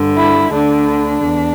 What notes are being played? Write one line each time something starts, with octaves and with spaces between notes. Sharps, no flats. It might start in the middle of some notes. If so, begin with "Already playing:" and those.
Already playing: G2 D3
E4
D2 D3 D4
E2